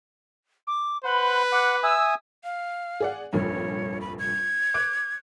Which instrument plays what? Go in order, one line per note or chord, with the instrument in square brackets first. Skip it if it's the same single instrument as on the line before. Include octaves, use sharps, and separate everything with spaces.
[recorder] D6
[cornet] B4 [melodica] C5 F#5 [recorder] B5
[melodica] F#5 [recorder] D6
[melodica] E5 G#5 D#6 [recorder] E6
[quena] F5
[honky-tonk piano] G#4 D5 F#5
[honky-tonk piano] F1 A#1 G2 [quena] C#5
[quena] B5
G#6
[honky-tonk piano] D6 F#6 D7